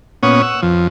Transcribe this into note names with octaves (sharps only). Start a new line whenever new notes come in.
A#2 B3 C#4 C#5 F#5 D#6
F#5 E6
F2 F3